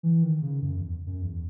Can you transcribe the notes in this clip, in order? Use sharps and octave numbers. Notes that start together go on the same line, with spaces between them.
E3
D#3
C#3
F#2
E2
F#2
E2